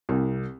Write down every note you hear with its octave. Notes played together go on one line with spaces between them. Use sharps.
C2